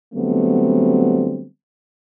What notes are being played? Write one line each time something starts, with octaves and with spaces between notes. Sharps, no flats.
D3 F#3 G3 A3 B3 C4